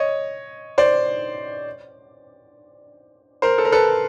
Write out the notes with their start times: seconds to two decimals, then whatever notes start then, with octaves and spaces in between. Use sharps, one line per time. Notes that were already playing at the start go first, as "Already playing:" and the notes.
Already playing: C#5 D#5
0.78 C5 D5
3.42 A#4 C5
3.58 A4
3.65 A#4
3.72 A4 B4